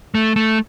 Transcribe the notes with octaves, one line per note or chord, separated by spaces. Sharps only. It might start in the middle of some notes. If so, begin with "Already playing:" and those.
A3
A3